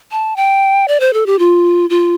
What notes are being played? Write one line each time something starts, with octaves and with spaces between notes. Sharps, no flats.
A5
G5
D5
C5
A4
G4
F4
F4